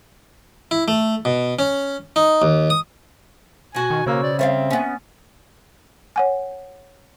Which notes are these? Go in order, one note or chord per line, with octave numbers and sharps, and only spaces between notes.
E4
A3
B2
C#4
D#4
D#2
D#6
B2 F#4 G#5
D#3 C#6
C#3 A#3 C5 C#5 E6
D5
G3 C4 C#5 E5 F5
B3 C#4
C#5 F#5 G#5